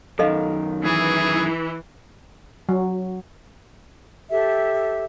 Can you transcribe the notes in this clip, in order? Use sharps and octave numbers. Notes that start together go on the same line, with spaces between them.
F#2 D#3 A4 D#5 F5
E3 G#4
F#3
G4 A4 E5